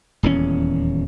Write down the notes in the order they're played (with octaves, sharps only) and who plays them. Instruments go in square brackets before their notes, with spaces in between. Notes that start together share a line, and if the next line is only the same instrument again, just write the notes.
[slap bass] D#1 E2 D#3 C#4